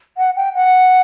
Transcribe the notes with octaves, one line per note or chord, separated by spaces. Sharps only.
F#5
G5
F#5